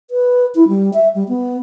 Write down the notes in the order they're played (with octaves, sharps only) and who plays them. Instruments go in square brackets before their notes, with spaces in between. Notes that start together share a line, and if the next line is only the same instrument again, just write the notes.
[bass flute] B4
E4
G3
E5
G3
B3